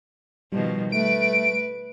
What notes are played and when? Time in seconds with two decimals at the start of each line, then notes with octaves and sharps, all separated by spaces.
0.52 B2 D#3 F3 G3
0.92 A3 B4 D7